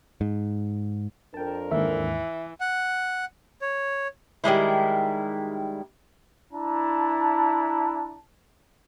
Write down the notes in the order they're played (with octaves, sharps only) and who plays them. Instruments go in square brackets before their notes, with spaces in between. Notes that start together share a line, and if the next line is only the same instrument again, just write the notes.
[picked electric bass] G#2
[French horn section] F2 D4 A#4 [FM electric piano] G5 A5
[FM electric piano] D#2 G#2 [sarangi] E3 [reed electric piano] E5
[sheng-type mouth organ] F#5
C#5
[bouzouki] D#3 G3 G#3 E4
[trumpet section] D4 E4 A5 A#5